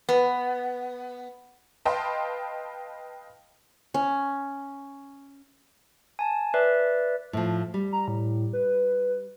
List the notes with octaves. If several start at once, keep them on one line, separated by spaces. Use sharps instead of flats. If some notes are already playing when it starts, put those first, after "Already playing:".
B3
B4 D#5 F5 G5 A5 C6
C#4
G#5 A5
B4 D5 E5
A2 F3
G3
A#5
A2
B4